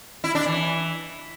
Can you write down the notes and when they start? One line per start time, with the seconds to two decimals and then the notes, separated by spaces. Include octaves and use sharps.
0.24 E4
0.35 D4
0.46 E3